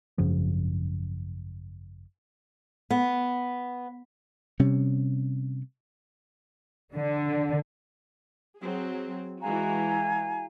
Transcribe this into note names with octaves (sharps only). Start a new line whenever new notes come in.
G#1 F#2 C#3 F3
B3
C3 G3 C#4
D3
F#3 C4 G#4
E3 G#3 F#4 F5 G#5 A#5